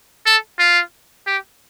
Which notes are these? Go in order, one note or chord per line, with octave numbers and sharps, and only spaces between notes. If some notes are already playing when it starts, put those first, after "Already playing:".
A4
F4
G4